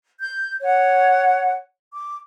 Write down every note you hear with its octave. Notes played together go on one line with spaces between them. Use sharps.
G6
C#5 F#5
D6